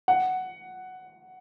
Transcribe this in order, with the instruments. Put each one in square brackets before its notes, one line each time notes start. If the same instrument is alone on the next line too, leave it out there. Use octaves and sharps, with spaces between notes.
[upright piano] F#5